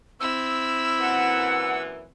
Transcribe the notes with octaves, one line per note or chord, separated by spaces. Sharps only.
C4 E4 E6
F#2 A#2 E3 F#5